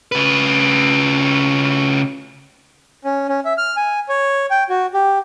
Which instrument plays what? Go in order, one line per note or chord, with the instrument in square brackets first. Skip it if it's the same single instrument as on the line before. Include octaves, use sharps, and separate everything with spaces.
[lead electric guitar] C#3 B4
[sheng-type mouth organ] C#4
C#4
E5
F6
G#5
C#5
G5
F#4
G4